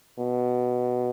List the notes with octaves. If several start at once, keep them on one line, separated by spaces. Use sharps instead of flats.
B2